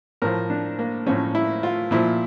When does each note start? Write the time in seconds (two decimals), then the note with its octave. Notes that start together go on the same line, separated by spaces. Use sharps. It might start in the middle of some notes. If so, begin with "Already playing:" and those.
0.22 A2 F3 A#4
0.50 D4
0.79 A#3
1.06 A2 F3 C#4
1.35 E4
1.63 F4
1.91 A#2 F3 E4